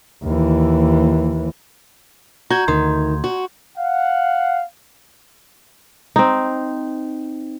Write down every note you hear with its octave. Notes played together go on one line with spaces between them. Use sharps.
D#2 E3
F#4 A#5 G6 G#6
D2 D#3 C6
F#4
F5 F#5
C4 D#4